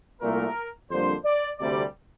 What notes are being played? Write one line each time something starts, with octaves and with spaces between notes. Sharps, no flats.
C2 A#2 A3 A#4
F2 D3 G3 A#3 D4 C5
D5
D2 C3 G3 D5